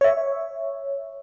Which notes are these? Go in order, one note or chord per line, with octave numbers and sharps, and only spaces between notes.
C#5 E5